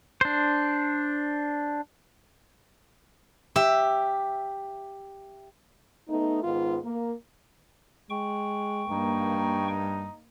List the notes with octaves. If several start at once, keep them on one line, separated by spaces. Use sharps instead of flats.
D4 C5
G4 E5
A3 B3 D#4
G#2 D#3 B3 F4
A#3
G#3 G5 C#6
G2 A#3 D#4